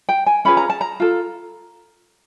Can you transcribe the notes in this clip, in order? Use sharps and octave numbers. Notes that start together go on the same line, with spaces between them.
G5
G#5
C#4 F4 G#4 B4 B5
A#5
A5
A#5
F4 A4